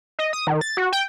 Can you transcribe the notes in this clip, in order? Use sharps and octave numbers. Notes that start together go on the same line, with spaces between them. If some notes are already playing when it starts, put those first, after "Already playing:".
D#5
D#6
D#3
A6
F#4
G5